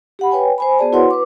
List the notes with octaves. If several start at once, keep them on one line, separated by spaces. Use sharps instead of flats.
G4 F#5 B5
B4 C#5 G5 G#5
C5 G#5 B5
B3 F#4 G#4 C5 D5 A5
E4 F#4 B4 C#5 F#5 C6
B4 D6